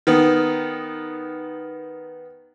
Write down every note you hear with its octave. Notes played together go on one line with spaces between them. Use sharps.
D#3 B3